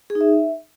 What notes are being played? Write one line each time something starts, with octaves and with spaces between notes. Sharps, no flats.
G#4
D#4
E5